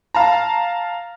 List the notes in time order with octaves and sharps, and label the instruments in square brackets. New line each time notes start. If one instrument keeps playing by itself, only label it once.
[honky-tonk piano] F5 A5 A#5